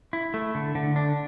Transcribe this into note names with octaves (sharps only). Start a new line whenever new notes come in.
E4
A3
D3
D3
D4